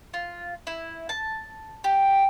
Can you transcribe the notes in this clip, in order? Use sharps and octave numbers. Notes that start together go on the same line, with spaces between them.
F4
E4
A5
G4